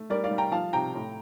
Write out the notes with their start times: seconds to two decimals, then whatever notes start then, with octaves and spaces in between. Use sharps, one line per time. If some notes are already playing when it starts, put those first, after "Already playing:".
Already playing: A3
0.10 G3 A#4 D5
0.24 D5 F5
0.31 G3
0.38 G5 A#5
0.52 F3 F5 A5
0.73 C3 G5 A#5
0.94 A2